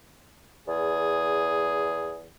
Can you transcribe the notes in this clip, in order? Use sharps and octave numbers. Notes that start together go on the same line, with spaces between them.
E2 G#4